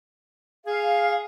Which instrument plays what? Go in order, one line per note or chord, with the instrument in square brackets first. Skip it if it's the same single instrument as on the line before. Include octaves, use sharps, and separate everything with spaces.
[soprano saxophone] G#4 [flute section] F5